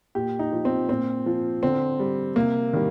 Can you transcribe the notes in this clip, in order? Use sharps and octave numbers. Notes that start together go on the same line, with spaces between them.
A#2 G4
D#4
F3
C4
A#2 C4
F3
D3 C4
G3
C3 A#3
D#3 G3